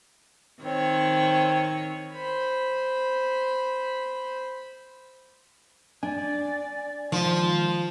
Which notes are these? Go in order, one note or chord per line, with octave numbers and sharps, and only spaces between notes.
D#3 C4 C#5
C5 B5
D4 D5 G#5
D#3 F3 G#3 C6